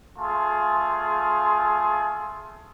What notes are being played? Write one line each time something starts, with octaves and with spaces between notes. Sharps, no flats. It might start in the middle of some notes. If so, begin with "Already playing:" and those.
A3 F4 G#4